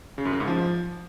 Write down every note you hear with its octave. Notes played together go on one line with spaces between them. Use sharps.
C#3
F#2
C#3
G#2
F3